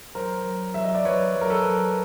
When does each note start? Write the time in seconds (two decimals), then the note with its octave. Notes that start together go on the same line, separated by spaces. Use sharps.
0.15 F#3 A#4 C5
0.45 F#3
0.74 F#3 E5
0.84 D#5
0.95 D5
1.05 F#3 B4 C#5
1.35 F#3
1.41 A#4
1.50 A4 B4
1.65 F#3